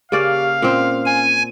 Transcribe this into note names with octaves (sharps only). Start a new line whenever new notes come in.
C#3 A#3 G4 D5 F5 C#6 F6
A#2 C4 C#4
G#5